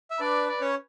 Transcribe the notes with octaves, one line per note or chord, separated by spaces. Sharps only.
E5
D4 B4 D5
D5
C#4 C#5